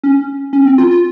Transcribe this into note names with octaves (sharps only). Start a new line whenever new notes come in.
C#4
C#4
C4
F4
F4